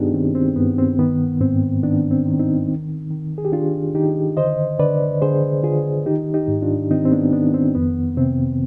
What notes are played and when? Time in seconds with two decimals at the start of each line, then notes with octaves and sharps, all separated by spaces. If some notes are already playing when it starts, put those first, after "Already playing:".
Already playing: G2 D#3 B3 D4 D#4 F4 G4 G#4
0.14 D#3 C4
0.35 C4
0.56 G2 B3
0.78 C4
0.99 D#3 B3
1.41 G#2 C4
1.83 D#3 B3 D4
2.11 C4
2.26 D#3
2.39 C4 D#4
2.67 D#3
3.10 D#3
3.38 G#4
3.45 G4
3.52 D#3 D4 F4
3.94 D#3 D#4 G4
4.37 D3 C5 D#5
4.79 D3 B4 D5
5.21 D3 G#4 C5
5.63 D3 F4 G#4
6.06 D#3 D#4 G4
6.34 D#4 G4
6.48 G#2
6.62 D4 F4
6.91 D#3 C4 D#4
7.05 C4
7.12 B3 D4
7.33 D#3 B3 D4
7.54 C4
7.75 F2 B3
8.17 C3 C4